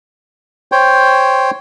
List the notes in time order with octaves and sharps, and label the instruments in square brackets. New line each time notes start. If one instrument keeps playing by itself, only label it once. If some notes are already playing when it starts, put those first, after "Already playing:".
[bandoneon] C5 C#5 G5